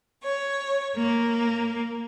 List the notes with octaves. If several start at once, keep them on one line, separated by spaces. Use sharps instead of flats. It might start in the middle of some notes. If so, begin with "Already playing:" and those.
C#5
A#3